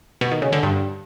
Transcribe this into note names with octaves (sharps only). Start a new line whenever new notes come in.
B2
D#3
C#3
D3
G2